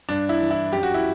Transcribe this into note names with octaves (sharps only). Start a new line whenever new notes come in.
G2 D4
E4
E3
E4
F#2 G4
F#4
E4